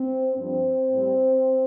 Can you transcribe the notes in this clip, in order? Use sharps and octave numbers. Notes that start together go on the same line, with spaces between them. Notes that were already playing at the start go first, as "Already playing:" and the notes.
Already playing: C4
G2 F3 C4
A2 G3